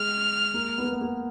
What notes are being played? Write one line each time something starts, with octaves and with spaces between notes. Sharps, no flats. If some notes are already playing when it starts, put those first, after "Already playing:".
Already playing: G#3 F6
A#3
B3
A#3
B3
A#3